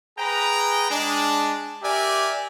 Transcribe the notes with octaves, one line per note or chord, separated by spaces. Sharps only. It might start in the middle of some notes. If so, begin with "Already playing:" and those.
G#4 B4 G5 A#5
G#3 D4
G4 A#4 D5 E5 G#5